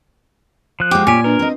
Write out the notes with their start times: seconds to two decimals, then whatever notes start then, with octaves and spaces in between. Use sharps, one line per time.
0.80 F3 F#6
0.91 G#3 G4 F#5
1.07 A#2 C#4 F4 G4 G#5
1.24 D4 A#4 B4
1.39 C4 D#5